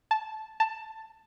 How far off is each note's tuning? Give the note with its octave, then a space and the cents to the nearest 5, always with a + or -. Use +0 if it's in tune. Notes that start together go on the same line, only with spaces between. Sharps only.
A5 -10
A5 +10